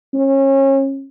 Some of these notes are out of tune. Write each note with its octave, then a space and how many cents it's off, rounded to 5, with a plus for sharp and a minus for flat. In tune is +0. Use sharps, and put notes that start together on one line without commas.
C#4 -30